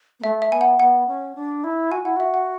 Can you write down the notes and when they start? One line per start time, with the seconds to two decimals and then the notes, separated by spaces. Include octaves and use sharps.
0.20 B3
0.23 A3 E5
0.42 E5
0.51 B3 G#5
0.61 F#5
0.79 B3 F#5
1.08 C#4
1.35 D4
1.64 E4
1.91 F#4 G#5
2.04 E4 F#5
2.16 F#4 E5
2.34 F#5